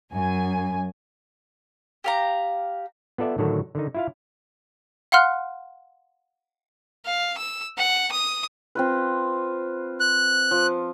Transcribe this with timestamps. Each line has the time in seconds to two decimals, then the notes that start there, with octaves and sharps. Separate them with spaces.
0.12 F#2 G#5
2.04 G4 F5 A#5
3.18 B3 F4 A4 D5 E5
3.38 A2 D3 D#3 F#3 F#4 A4
3.75 D3 D#3 D#4
3.95 E4 F4 F5
5.12 F5 F#5 C6 F6 F#6
7.05 F5
7.38 E6
7.78 F#5
8.12 D#6
8.75 C4 F4 B4
10.00 F#6
10.51 F3